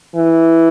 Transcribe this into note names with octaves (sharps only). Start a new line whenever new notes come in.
E3